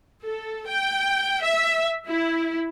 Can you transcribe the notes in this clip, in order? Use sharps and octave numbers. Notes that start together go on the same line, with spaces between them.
A4
G5
E5
E4